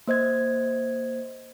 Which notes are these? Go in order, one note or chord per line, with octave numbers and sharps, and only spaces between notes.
A#3 C5 D#5 G#6